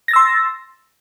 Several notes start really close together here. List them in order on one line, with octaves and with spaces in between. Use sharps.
A#6 A6 E6 C6